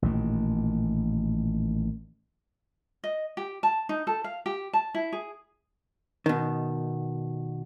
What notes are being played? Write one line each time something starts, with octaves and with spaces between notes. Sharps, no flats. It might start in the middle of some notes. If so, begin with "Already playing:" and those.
A1 A#2 D#3
D#5
G4
A5
D#4
A4
F5
G4
A5
E4
G#4
B2 D#3